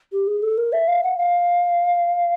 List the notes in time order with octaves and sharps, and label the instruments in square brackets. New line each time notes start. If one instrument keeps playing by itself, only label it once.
[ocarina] G4
G#4
A4
A#4
E5
F5
F#5
F5